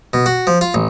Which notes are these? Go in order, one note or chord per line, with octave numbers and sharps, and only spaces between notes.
B2
F#4
F3
F4
A1